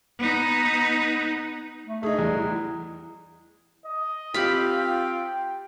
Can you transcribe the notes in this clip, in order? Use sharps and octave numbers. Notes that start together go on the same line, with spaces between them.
B3 D#4
A3
A3 D#4 G#4
E2 G3
E4
D#5
C4 F4 G4 F5 B5
G5